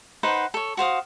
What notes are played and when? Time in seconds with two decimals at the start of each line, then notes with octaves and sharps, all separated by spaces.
0.23 D#4 B4 C5 F#5
0.54 A4 C#5
0.77 F#4 C5 F5 D#6